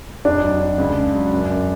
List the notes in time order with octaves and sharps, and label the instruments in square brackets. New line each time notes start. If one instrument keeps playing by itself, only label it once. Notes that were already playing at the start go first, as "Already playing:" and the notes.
[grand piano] F1 [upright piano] D4
[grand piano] F#3
F#3
C#2
C#3
F#3
F#2
F#2